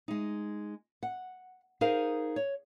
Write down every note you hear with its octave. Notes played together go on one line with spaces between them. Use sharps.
G#3 D#4
F#5
D#4 G#4 A#4 C5 F5
C#5